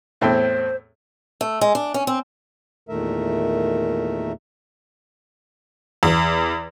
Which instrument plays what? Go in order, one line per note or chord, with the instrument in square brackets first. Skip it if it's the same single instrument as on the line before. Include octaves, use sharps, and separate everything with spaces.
[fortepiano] E2 A2 C4 [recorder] C5
[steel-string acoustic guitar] A3
G#3
D4
C#4
C4
[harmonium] E2 A#2 D#3 A3 A#4 E5
[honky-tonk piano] E2